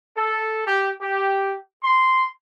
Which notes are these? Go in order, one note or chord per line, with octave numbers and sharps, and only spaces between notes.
A4
G4
G4
C6